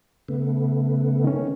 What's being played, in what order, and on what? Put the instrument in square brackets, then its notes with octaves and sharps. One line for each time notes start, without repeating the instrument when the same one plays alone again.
[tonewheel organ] C#3 A3 B3
[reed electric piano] D#3 C#4